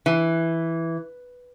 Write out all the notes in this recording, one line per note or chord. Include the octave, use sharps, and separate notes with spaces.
E3